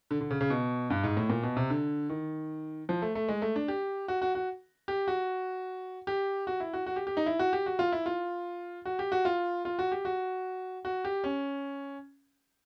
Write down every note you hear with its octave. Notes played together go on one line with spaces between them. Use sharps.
D3
D3
C#3
C#3
B2
G2
G#2
A2
A#2
B2
C3
D3
D#3
F3
A3
A3
G#3
A3
D4
G4
F#4
F#4
F#4
G4
F#4
G4
F#4
E4
F#4
F#4
G4
G4
D#4
E4
F#4
G4
F#4
F4
E4
F4
F#4
G4
F#4
F4
F4
F#4
G4
F#4
F#4
G4
C#4